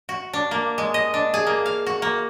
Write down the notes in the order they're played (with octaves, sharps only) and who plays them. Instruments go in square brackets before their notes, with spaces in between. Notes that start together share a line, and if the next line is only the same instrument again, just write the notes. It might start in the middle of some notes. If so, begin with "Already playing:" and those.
[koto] F#4
D4
A#3
G#3
D#5
D4
G#4
A#3
F5
F#4
A#3